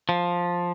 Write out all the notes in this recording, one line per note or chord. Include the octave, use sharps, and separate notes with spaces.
F3